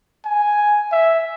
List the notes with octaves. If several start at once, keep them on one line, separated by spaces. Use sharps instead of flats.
G#5
E5